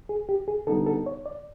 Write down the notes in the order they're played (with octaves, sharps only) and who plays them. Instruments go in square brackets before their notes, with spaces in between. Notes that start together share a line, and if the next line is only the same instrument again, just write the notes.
[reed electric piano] G#4
G4
G#4
[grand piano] D3 G3 B3 D#4 [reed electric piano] A4
[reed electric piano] A4
C#5
D5